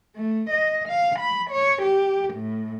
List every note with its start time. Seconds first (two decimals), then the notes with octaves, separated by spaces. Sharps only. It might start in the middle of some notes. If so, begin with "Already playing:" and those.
0.15 A3
0.51 D#5
0.88 F5
1.19 B5
1.50 C#5
1.82 G4
2.34 A2